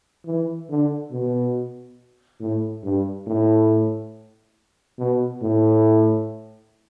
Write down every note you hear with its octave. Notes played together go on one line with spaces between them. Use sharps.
E3
D3
B2
A2
G2
A2
B2
A2